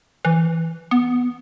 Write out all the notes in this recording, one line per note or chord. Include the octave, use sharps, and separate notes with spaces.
E3
B3